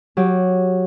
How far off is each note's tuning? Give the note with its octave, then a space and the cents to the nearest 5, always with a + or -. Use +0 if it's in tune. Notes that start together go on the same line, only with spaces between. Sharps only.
F#3 -10 G4 +0